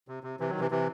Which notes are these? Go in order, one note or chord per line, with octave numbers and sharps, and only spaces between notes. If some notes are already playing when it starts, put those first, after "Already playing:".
C3
C3
C3 E3
D#3 F#3
C3 E3
C3 E3